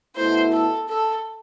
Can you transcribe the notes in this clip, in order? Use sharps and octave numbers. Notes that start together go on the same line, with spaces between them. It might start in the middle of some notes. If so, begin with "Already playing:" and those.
B2 A3 E4 C5
A4
A4